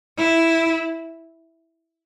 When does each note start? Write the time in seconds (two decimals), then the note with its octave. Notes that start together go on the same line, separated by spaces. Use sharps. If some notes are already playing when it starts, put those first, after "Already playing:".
0.18 E4